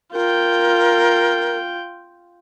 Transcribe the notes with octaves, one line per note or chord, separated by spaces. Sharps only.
F4 A#4 G5